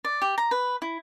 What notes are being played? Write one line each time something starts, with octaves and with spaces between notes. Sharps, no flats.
D5
G4
A#5
B4
E4